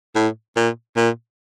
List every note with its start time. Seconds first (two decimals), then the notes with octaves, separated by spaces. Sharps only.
0.15 A2
0.56 A#2
0.97 A#2